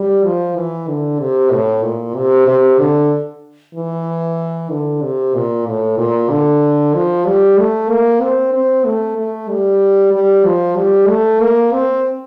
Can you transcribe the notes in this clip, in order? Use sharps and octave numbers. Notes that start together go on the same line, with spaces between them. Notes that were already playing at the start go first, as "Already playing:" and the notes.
Already playing: G3
F3
E3
D3
C3
A2
A#2
C3
C3
D3
E3
D3
C3
A#2
A2
A#2
D3
F3
G3
A3
A#3
C4
C4
A3
A3
G3
G3
F3
G3
A3
A#3
C4